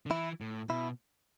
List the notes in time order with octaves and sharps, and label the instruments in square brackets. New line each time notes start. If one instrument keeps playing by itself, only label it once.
[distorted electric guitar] D3
[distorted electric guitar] E3 [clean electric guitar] E4
[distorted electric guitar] A2
[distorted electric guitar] B2 [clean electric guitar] E4